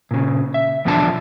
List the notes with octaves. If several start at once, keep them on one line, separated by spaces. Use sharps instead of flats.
A#2 C#3
E5
E2 B2 D3 F3 D4 A5